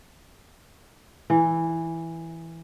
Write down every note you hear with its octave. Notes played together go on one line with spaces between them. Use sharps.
E3